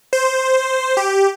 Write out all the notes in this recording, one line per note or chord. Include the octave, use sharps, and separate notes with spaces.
C5
G4